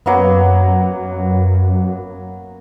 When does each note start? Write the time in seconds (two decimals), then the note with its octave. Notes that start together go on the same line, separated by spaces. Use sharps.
0.06 F#2 F#3 A#3 B3